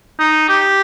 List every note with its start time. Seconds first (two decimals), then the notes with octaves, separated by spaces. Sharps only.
0.19 D#4
0.49 G4